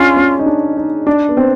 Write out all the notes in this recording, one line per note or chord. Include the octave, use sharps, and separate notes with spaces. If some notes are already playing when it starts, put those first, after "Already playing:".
Already playing: C#4 D4 F4
C#4
D#4
D4
D#4
D4
B3
C4